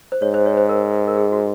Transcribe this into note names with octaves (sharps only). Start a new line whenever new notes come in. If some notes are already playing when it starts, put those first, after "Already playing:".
C5
G#2 C#5
C5
C#5
C5
A#4
A#4
G#4
F#4